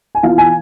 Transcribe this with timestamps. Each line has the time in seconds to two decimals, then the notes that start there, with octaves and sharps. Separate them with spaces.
0.15 G#5
0.23 E3 B3 F4 F5
0.38 G#5